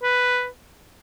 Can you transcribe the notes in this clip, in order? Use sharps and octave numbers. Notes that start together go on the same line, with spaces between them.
B4